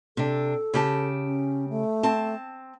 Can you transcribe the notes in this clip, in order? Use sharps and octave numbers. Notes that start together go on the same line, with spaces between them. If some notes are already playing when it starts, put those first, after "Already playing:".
C3 D4 A4
C#3 G4 A5
C#4
A3
C4 A5